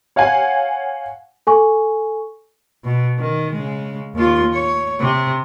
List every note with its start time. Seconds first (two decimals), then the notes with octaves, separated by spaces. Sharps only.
0.16 C#5 F5 F#5 G#5
1.47 A4 G#5 C#6
2.85 B2
3.19 D#3
3.53 C#3 G#3
4.15 D#2 F4
4.54 C#5
5.00 C3